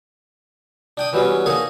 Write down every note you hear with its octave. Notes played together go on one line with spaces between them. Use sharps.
D4 G5 D#6
E3 F#3 G3 B3 C#4
A#3 D#4 G#4 A4 C#5 D#5